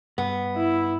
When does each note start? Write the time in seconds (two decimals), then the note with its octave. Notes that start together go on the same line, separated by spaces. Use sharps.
0.18 G2 B3
0.57 E4